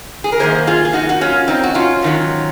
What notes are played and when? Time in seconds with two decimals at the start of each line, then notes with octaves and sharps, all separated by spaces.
0.24 G#4
0.32 A#4
0.39 F#2 D#3 A#3 G#4 C5
0.67 F4 G#4
0.85 G#4
0.93 D#4 F#4
1.09 F#4
1.21 C#4 F4
1.48 C4 D#4
1.63 F#4
1.74 C#4 F4
2.02 G#2 D#3 F#3